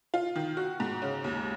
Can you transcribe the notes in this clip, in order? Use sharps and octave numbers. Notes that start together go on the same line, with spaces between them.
F4
D#3
F#4
G#2
C#3
D#2